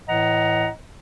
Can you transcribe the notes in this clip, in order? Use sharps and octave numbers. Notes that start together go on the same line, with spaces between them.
A2 E3 D#5 F#5 A#5